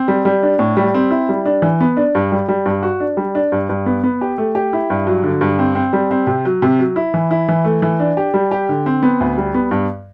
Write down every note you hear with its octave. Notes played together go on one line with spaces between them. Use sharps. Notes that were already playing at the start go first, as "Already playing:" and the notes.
Already playing: C4
G3
G3
D4
A2
G3
C4
E4
G3
D4
E3
B3
D4
G2
G3
G3
G2
F#4
D4
G3
D4
G2
G2
B3
B3
G4
A3
G4
E4
G2
F#3
D3
G2
C4
C4
G3
C4
C3
F#3
C3
F#3
E4
E3
E4
E3
A3
E3
D4
G4
G3
G4
D3
C4
B3
D2
G3
B3
G2